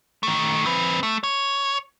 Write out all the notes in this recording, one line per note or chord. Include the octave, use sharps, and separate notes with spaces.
D#3 A3
C4 B4
A3
C#5